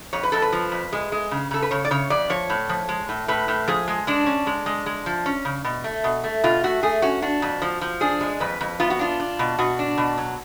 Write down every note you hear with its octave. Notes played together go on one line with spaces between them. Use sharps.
F2 C#5
B4
F2 A4
B4
F3
F2
G#3
G#3
C#3
C#3 A4
B4
C#3 C#5
D5
C#3 C#5
F2 D5
F3 C#5
A2
F3
G#3
A2
A2 B4
A2
F3 G#4
G#3
G#3 D4
C#4
G#3
G#3
G#3
F3
C#4
C#3
B2
A3
B2
A3
B2 F4
A3 F#4
A3 G#4
C#4 F#4
D4 F#4
F2
F3
F3
D4 G#4
G#3
F2 B4
F2
B3 F4
F#4
D4 F4
D4
B2
B2 F#4
D4
B2
F#3